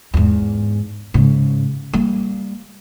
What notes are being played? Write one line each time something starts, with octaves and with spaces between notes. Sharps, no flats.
E2 G#2
G#2 C#3
G3 A#3